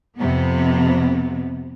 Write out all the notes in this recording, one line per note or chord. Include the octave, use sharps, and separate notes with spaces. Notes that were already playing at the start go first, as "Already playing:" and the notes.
F2 C3 B3